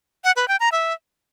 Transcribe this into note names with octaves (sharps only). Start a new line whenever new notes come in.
F#5
B4
G5
A#5
E5